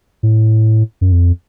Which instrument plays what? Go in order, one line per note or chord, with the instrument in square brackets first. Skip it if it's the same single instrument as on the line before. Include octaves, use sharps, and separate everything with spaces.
[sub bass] A2
F#2
F2